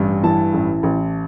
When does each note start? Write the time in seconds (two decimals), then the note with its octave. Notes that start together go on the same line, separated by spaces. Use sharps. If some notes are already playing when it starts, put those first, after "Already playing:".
Already playing: A1 G2
0.23 E3 A5
0.53 A1
0.83 A1